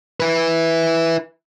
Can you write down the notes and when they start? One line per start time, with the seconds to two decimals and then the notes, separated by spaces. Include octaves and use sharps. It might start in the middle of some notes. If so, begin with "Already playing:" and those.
0.20 E4 B4